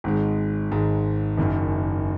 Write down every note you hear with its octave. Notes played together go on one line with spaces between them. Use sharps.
G#1 G#2 G#3
G#1 G#2 G#3
F#1 F#2 D#3